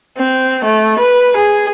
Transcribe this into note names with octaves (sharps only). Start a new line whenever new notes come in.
C4
A3
B4
G#4